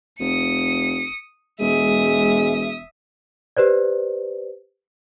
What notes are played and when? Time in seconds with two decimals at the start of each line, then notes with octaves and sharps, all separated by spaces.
0.20 F1 D#6 C#7
1.60 E1 G#3 E5 D#6
3.57 G4 B4 C5 D5